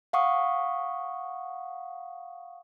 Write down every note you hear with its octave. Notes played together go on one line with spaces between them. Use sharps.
F5 F#5 C#6 D#6